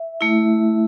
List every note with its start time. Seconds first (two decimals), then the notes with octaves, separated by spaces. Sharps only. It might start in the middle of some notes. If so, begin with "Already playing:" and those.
Already playing: E5
0.21 A3 E4